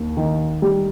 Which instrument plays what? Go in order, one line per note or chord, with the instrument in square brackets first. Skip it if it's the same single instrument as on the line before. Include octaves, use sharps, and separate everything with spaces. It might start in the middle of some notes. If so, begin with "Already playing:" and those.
Already playing: [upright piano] D#2
D#3
G3